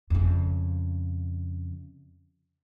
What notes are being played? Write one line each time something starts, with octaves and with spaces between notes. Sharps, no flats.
F2 C#3